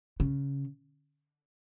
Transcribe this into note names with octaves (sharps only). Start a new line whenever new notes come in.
C#3